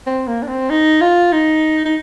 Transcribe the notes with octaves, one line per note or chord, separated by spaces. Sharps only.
C4
A#3
D4
C4
D#4
F4
D#4
D#4